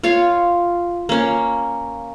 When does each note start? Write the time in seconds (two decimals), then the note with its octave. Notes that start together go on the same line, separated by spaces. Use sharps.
0.03 F4 C#5 F5
1.09 A#3 C#4